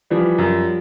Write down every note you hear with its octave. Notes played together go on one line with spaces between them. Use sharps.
E3 F3 G3
F#2